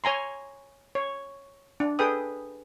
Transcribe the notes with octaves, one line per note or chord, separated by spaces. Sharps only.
C#5 G#5 A#5 C6
C#5
D4
G#4 A4 B4 G5 D#6